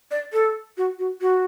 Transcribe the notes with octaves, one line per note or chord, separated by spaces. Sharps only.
D5
A4
F#4
F#4
F#4